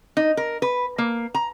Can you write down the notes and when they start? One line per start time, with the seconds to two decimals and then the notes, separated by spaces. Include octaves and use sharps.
0.17 D#4
0.37 A#4
0.62 B4
0.98 A#3
1.34 A#5